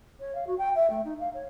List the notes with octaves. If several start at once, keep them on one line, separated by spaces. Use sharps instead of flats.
C#5
F5
F#4
G5
E5
A3
D#4
F5
C#5